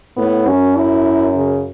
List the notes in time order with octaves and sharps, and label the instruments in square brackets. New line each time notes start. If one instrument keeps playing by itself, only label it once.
[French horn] A2 [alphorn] B3
[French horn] F#2 [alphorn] C#4
[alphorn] E4
C#3